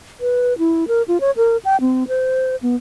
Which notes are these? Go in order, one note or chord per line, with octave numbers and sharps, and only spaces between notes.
B4
E4
A#4
F4
C#5
A#4
G5
C4
C5
B3